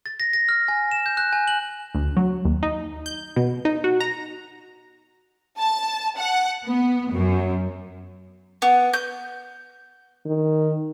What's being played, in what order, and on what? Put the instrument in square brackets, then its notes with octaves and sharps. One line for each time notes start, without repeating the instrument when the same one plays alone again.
[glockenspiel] A6
A#6
A#6
F6
G#5
E7
G6
F#6
G#5
F#7
[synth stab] D2
F#3
D#2
D#4
G6
B2
D#4
F#4
A#5
[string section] A5
F#5
B3
F#2
[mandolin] B3
G6
[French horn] D#3